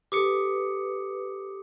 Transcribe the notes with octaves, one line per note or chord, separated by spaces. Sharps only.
G4 A4 B4 D6 D#6 C#7